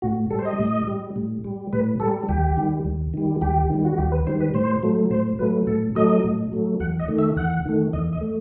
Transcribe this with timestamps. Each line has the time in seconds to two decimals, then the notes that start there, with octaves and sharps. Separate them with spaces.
0.02 A2 F#4
0.30 G3 A4
0.39 C5
0.45 D#5
0.59 A2
0.87 G3
1.16 A2
1.44 G3
1.73 A2 B4
2.00 G3 A4
2.28 D#2 G4
2.57 D#3 G3
2.84 D#2
3.14 D#3 G3
3.41 D#2 G4
3.70 D#3 G3
3.85 F#4
3.98 D#2 G4
4.12 B4
4.27 D#3 G3 C5
4.40 B4
4.54 A2 C5
4.83 F#3 A3
5.10 A2 C5
5.39 F#3 A3 B4
5.67 A2 A4
5.95 F#3 A3 D#5
6.24 A2
6.52 F#3 A3
6.80 E2 F#5
6.99 D#5
7.08 D#3 A3
7.19 E5
7.37 E2 F#5
7.65 D#3 A3
7.93 E2 D#5
8.13 D#5
8.21 A3